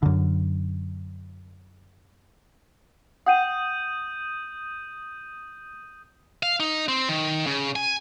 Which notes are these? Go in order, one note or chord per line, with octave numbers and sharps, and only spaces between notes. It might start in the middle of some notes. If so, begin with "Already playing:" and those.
F#2 D3
F#5 G5 D#6 G6 D#7
F5
D#4
C4
D#3
C#3
G#5